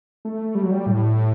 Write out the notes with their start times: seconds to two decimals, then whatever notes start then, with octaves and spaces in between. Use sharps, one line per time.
0.25 A3
0.55 G3
0.63 F#3
0.71 G3
0.87 A2